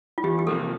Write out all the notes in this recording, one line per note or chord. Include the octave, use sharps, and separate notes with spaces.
F4
E2 G4
G4
C3 F3 A#3 A4